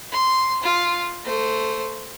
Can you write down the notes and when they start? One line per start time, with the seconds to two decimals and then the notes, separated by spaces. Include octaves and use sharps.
0.11 C6
0.63 F4
1.24 A3 C5